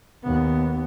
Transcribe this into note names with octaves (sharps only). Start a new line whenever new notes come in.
D#2 B3